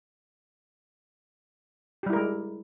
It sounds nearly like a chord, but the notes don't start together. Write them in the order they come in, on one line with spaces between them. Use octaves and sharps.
G4 G3 E4 A#4 G#3